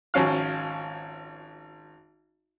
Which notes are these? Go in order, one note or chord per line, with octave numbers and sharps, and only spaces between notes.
G#1 F3 C#4 F#4 F5 F6